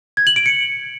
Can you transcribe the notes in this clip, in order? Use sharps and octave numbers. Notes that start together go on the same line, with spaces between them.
G#6
F#7
D7
C#7